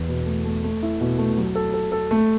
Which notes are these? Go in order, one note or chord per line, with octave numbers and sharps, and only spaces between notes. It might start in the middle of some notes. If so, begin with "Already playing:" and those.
Already playing: E2
B2
A3
A3
A3
E4
B2
A3
F#3
A4
A4
A4
A3